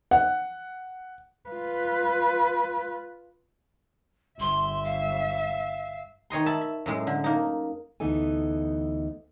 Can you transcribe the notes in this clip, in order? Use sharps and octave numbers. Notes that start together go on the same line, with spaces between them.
F#5
F4 B4
G1 E5 C6
F5
D#3 C#5 D#5 C6
E5 A5 B5
E5
F#2 A2 G#3
D3
A#3 D#4
D2 E3 B3 D#4 A4 G#5